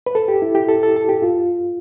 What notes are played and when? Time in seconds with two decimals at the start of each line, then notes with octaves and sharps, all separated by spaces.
0.06 B4
0.15 A4
0.28 G4
0.42 E4
0.55 G4
0.69 A4
0.83 A4
0.96 A4
1.09 G4
1.22 F4